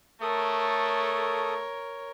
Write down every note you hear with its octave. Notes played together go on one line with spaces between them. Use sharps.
A3 A4 A#4 C#5 D#6